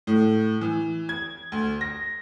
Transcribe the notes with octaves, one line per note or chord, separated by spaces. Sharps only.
A2
E3
G#6
D2
A#6